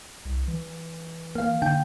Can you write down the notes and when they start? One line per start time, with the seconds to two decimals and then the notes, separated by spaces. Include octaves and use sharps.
0.25 C2
0.48 E3
1.35 A#3 F5
1.62 D3 G5